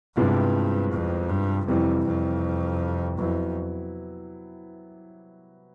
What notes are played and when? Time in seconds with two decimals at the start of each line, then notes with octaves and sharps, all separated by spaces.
0.17 C2 G2 C3 F3 G#3 B3
0.92 F2
1.29 G2
1.67 F2 C3 E3 G3
2.05 F2
3.18 F2 F#3 B3 E4